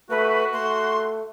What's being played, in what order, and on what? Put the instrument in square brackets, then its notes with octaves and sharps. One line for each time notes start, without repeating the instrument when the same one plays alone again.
[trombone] A3 [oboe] F#4 [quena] B4
[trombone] A3 [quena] C6